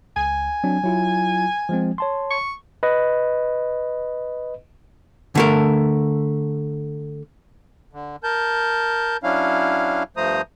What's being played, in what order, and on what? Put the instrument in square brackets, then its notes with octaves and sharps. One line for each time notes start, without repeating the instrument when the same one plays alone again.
[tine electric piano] C#2 [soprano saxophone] G#5
[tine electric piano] F#3 C4 D4
F#3 E4 F4
F3 G#3 C4
C#5 A5 C6
[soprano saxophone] C#6
[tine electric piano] B4 D#5
[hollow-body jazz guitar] D3 A3 A#4
[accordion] D3
A#4 A5 G6
F#3 C#4 D4 E4 F5
G2 F3 A3 C5 A#5 D#6